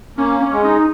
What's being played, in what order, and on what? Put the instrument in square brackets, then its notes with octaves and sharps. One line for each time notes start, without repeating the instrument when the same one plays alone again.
[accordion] A#3 [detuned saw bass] C#4
[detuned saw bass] C#4
[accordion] G#3
[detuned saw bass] D#4